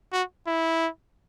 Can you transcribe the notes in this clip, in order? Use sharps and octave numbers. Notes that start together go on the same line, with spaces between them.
F#4
E4